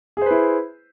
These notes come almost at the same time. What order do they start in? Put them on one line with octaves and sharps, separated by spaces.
G#4 C5 B4 E4